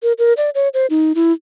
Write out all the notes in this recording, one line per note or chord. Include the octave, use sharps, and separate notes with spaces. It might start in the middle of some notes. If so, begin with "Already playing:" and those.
A#4
A#4
D5
C#5
C5
D#4
E4